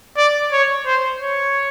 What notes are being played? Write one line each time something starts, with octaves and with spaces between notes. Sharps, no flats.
D5
C#5
C5
C#5